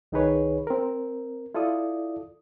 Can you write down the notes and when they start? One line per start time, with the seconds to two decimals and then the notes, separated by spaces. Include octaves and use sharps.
0.12 C2 D#3 D#4 G#4 B4 C#5
0.67 C4 A#4
1.55 E4 F4 A4 D5 D#6